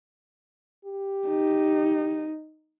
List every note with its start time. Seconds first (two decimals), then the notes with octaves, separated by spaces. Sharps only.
0.85 G4
1.28 D#4